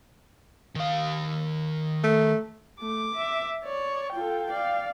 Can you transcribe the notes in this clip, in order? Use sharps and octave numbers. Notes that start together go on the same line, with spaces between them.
D#3 F5
A3
A3 D6
E5
C#5 D5
F4 A4 G5
D5 F5